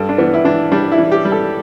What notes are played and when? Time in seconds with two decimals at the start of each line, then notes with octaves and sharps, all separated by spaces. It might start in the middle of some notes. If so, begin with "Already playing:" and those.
Already playing: G2 A4
0.09 D4
0.18 E3 B3
0.34 E4
0.45 E3 D4
0.72 G3 D4
0.92 E4
0.98 E3
1.12 G4
1.25 G3
1.32 A4